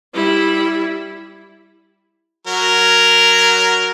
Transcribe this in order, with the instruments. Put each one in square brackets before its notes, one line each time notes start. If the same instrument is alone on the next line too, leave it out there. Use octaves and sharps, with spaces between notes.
[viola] G3 E4
[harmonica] F#3 A#4